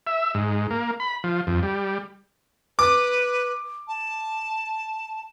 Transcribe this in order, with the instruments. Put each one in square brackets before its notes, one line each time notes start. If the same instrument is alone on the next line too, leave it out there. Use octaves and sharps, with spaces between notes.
[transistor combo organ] E5
G#2
A#3
B5
F3
F2
G3
[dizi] B4 [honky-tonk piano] D6
[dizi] A5